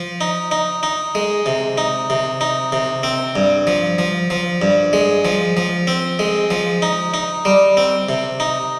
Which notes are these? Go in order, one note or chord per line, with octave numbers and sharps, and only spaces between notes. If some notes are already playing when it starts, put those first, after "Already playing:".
Already playing: F3
D#4
D#4
D#4
G#3
C3
D#4
C3
D#4
C3
C4
G2
F3
F3
F3
G2
G#3
F3
F3
C4
G#3
F3
D#4
D#4
G3
C4
C3
D#4